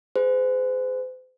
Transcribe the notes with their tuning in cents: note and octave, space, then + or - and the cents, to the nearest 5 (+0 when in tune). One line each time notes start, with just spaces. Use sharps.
G#4 +5 C5 -40